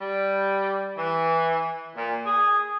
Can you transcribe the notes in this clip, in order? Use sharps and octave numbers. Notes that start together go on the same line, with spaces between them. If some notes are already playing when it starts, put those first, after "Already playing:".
G3
E3
A#2
G#4